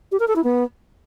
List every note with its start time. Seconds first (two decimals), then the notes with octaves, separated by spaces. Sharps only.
0.12 G4
0.20 A#4
0.28 A4
0.36 E4
0.44 B3